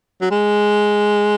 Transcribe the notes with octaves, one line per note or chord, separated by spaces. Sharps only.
F#3
G#3